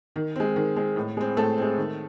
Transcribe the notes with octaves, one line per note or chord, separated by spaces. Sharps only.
D#3
G#3 C4
D#3
G#3 C4
A2
G#3 C4
A2 A3 A4
G#3 C4
D#3